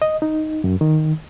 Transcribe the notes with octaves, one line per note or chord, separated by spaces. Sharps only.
D#5
D#4
F#2
D#3